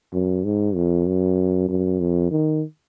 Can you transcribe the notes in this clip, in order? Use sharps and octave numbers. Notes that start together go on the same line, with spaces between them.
F#2
G#2
F2
F#2
F#2
F2
D#3